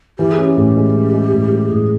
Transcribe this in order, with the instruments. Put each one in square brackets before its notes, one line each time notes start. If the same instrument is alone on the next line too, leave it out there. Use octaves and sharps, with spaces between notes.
[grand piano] E3 [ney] G4
[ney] G#4
[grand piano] C#4
[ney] G4
[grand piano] A2
G#3
C#4
G#3
A2
G#3
[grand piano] A2 [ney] G#4